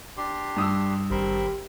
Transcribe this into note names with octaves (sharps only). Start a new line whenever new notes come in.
D4 G4 C6
G2 D#6 E6
G#1 G4 A#4 C5 B5